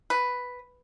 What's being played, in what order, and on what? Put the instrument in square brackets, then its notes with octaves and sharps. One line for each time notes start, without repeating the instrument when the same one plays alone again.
[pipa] B4